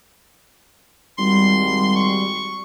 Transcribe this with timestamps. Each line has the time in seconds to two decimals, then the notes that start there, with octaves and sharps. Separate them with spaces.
1.18 G#1 G3 C6
1.96 C#6